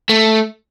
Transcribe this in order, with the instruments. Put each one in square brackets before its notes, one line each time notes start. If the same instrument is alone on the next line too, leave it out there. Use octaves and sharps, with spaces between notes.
[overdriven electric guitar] A3